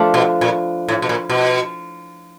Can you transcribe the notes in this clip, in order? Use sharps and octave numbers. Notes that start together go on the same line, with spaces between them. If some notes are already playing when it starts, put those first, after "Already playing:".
Already playing: F3 A3 D4 F4
B2
A#2
A2
B2
A#2
B2